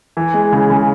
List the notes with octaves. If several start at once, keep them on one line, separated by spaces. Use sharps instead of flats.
E3
G#3
C#3
C#3